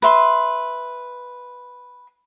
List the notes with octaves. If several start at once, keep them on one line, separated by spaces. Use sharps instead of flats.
B4 E5 C6